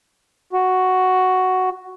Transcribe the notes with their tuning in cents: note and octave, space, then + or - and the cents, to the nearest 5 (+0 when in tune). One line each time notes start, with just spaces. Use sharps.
F#4 +5